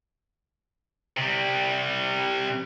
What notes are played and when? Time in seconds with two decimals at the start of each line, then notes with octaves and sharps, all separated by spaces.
1.17 C3 G3